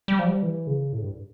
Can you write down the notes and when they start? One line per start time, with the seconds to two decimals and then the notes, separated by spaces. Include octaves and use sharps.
0.08 G3
0.19 F3
0.26 G3
0.43 E3
0.67 C#3
0.93 A2
1.02 G2